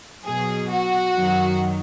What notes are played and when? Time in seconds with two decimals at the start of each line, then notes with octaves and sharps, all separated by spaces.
0.24 B2 F#3 G#4
0.70 F#4
1.15 F#2 D#3 F#3